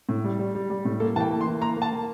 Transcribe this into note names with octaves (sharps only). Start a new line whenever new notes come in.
A2
G3
G3
G3
G3
A2
A#3 A4
E3 G5 A5
A#3
C6
E3
A#3 A#5
A#3
A5
A#3